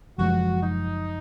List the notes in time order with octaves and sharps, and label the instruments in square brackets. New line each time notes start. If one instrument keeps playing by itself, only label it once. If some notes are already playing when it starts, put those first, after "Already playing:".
[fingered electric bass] F#1 F#2 F3 G#3 [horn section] F#4
[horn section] D#4